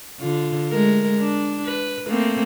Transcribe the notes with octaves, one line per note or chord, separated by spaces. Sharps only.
D3 F4
G#3 A3 A#4
D4
B4
A3 A#3 C4